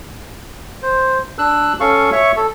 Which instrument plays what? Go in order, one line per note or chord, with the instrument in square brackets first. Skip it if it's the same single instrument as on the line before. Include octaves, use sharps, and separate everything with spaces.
[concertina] C5
D4 E6 F#6
C#4 A4 F5 C#6
C#5 E5 C#6
A4